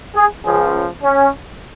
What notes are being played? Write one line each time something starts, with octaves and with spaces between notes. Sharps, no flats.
G#4
C#2 C#3 F3 G#4
C#4